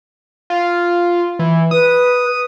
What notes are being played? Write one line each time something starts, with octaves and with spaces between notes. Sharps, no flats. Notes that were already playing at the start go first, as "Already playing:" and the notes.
F4
E3
B4 D#6